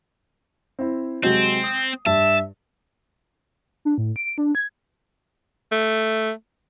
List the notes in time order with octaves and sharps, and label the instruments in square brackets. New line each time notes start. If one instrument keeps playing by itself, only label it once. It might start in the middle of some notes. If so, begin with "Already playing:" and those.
[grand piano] C4 E4
[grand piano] C3 F#3 G#3 [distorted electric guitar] C4
[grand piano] D#6
[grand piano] G2 [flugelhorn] E5 [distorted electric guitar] A5
[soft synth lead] D4
A2
D7
D4
G#6
[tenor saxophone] A3